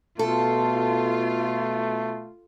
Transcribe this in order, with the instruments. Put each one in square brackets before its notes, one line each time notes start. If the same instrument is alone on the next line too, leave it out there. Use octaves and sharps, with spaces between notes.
[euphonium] B2 [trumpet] A3 [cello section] F4 [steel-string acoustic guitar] A4